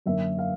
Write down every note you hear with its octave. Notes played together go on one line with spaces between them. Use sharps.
F#2 D3 F#3 A#3 E5
F5